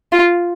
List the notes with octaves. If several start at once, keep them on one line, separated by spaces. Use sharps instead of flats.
F4